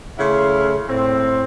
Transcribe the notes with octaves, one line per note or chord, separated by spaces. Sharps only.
C#3 A3 C#4 E4 F5 C6
A2 C4